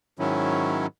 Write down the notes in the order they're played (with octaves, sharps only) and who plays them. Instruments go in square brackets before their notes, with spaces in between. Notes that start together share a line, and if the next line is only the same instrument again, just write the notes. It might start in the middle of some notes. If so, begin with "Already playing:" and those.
[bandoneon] G#2 D#3 F#3 C#4 E4